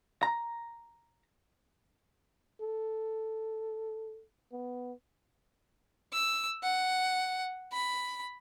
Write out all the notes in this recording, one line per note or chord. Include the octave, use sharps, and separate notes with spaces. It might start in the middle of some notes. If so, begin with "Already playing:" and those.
A#5
A4
B3
E6
F#5
B5